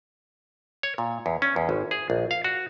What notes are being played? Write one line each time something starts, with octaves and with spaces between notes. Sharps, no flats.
C#5
A#2
E2
C#4
E2
G#1
G#4
A#1
F5
F#4